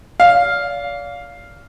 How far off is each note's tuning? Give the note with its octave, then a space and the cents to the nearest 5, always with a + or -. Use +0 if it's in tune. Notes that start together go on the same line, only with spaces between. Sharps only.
D5 -40 F5 +0